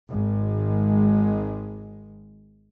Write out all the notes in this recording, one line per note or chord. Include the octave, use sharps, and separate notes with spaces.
G#1 G#3